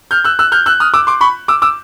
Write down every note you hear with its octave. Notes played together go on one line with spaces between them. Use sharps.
F6 G6
E6 F#6
E6 F#6
F6 G6
E6 F#6
D#6 F6
D6 E6
C6 D6
B5 C#6
D6 E6
D6 E6